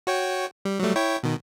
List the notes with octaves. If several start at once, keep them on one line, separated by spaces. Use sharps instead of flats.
F#4 C#5 G5
G3
F#3 G3 A3
E4 C#5 G5
B2 D#3